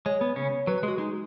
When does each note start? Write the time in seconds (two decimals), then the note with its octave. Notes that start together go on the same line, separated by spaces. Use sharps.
0.06 G#3 C#5
0.21 B3
0.36 C#3 C#4
0.67 F#3 B4
0.78 B4
0.83 G#3 F#4
0.98 G#3 D#4